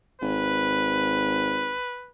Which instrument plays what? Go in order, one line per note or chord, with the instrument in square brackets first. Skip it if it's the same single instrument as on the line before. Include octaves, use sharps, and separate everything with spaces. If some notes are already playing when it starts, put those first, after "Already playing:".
[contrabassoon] G#1 [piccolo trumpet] B4